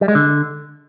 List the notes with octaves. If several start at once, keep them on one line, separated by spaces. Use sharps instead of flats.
G3
G#3
D3